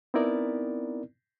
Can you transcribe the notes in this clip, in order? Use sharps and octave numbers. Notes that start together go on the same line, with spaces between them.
B3 C4 D#4 E4 A#4 D5